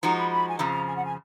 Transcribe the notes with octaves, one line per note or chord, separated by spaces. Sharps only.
F3 G#3 D#4 F#4 A#5
B5
B5
G#5
F2 C#3 F3 A#5
A#5
G#5
F#5
G#5